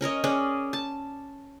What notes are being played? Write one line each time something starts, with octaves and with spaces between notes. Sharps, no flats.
C#4 A#4 C#5 D#5
C#4 G#4 D5
A5